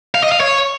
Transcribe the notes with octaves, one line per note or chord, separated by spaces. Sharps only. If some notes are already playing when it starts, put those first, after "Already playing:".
F5
D#5
F5
C#5